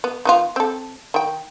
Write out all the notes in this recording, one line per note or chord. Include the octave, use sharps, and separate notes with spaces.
B3
D#3 B3 F4
C4 A4
D#3 G5